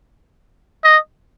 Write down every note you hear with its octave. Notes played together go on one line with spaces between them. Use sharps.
D#5